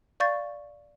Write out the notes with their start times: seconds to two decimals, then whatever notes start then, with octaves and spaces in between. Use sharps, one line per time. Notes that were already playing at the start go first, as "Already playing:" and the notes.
0.20 D5 F5 C#6 G6 A6